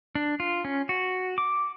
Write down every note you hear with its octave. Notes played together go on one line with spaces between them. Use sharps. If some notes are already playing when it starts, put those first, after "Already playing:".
D4
F4
C#4
F#4
D6